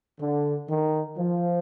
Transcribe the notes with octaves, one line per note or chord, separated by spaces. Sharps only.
D3
D#3
F3